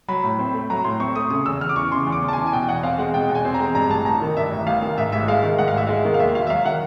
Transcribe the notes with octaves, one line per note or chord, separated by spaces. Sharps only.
F#3 B5
A2
C4
A3
F#3 A#5
A2 C6
C4 C#6
A3 D#6
C#3 D#6
E2 E6
E2 F6
D6
E3 C#6
C#3 C6
E2
D6
E2
A5
E3 G#5
G#5
B2 G5
E2 F#5
C4 F5
G#3 F#5
B2 G5
E2
G#5
C4
A#5
G#3
G2 A#5
A1 A5
A1 A#5
D#3
G2 E5
A1
A1 F5
D#3
G#2 E5
A1 E5
G#3 F5
D#3
G#2 F#5
F5
A1 E5
G#3 F5
D#3
F5
D#2 E5
E1 F5
E5
F#3 F5
D#3 F#5